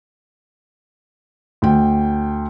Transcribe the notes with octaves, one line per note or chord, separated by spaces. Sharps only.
D2 G5